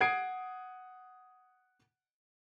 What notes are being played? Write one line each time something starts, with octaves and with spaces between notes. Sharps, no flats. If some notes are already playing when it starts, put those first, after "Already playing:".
F#5 D#6 G#6 C7 D7